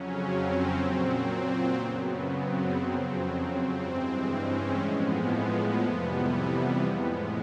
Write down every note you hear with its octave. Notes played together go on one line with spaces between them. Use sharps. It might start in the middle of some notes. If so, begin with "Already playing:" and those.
Already playing: F2 C#3 F#3 C#4
C4
A#2 F#3
F#2 C#3 F#3 B3
C4
F2 C#3 F#3
G2 E3 G#3 C4
C#4
A2 F3 G#3 B3
F2 C3 E3 G3
A2 F3 G#3 B3